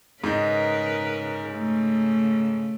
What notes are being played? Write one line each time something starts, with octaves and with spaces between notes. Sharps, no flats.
G#2 C#3 D#4 A#4 B4
C#3 A3